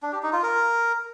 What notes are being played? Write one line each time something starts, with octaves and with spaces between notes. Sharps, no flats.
D4
G4
D#4
F4
A#4